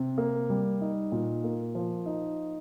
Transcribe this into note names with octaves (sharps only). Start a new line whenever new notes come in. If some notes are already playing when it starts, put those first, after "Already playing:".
Already playing: C3
A#3
G3
D#4
A#2
A#3
F3
D#4